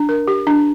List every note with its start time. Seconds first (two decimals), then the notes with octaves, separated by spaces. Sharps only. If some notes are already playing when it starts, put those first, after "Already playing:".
Already playing: D4
0.09 A#4
0.28 G4
0.47 D4